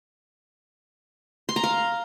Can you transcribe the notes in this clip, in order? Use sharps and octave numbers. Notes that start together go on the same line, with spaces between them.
C6
A#5
F5